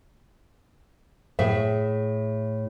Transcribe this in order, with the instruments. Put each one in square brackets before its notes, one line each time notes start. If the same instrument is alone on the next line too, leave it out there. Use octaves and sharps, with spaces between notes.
[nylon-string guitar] A2 G#4 E5